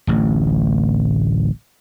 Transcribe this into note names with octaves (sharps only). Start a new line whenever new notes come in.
D1 A1